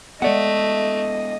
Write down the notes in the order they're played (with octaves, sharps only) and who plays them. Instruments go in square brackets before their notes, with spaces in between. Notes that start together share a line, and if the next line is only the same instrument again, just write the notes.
[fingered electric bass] G#3 B3 [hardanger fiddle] A3 [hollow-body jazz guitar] D5 F#5 [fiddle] D#5